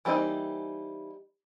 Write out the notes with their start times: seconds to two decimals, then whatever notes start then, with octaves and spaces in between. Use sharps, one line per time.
0.05 E3 G3 A#3 C4 D#4